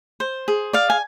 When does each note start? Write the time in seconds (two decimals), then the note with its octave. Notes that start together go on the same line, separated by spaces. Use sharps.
0.20 C5
0.48 G#4
0.73 D5 F5
0.90 G#5